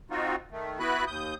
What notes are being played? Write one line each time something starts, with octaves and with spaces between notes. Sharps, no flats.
C4 D#4 F4 F#4
D#3 A3
B3 E4 F#4 B4 B5 F#6
D#2 D#6 G6